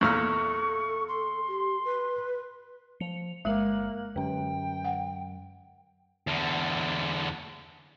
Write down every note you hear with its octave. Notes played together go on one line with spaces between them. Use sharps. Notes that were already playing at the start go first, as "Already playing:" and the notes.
E2 A#2 A4 C#6 F6
C6
G4
B4
F3 C#7 F7
G1 G#3 A#3 F#6 F#7
F#2 D3 C#4 G5
F#5
E2 D3